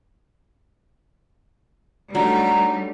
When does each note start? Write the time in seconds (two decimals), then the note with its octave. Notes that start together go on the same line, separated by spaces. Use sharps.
2.15 F#3 G3 A3 D4 D#4 A#5